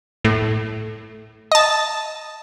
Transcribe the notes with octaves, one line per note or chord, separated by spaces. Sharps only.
A2
D#5 A5